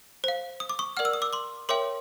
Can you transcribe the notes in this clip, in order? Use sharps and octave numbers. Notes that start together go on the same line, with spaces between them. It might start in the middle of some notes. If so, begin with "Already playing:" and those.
C5 F5
D#6
D6
C#6 D#6
A#4 D5 F#5 F6
E6
D#6
D6 E6
C6 D6
A#4 C#5 E5 G5 C6 D6